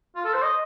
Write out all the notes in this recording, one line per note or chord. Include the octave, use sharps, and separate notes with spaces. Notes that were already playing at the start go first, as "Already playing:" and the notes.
F4
A4
C5
D#5